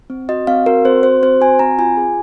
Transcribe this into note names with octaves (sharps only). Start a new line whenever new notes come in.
C4
F#4 D#5
C4 F5
F#4 A#4
C4 C5
F#4 C5
C4 C5
F#4 G#5
C4 A#5
F4 G#5
G#4